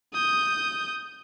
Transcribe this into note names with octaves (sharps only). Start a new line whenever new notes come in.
D#6 G6